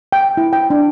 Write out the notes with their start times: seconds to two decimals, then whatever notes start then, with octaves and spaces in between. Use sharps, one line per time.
0.12 G5
0.37 E4
0.53 G5
0.70 D4